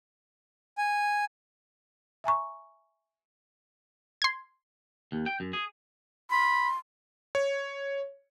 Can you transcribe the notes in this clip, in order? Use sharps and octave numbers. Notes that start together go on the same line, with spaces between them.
G#5
E5 G#5 A#5 C#6
C6 G#6
D#2
G5
F#2
G#4
B5 C6
C#5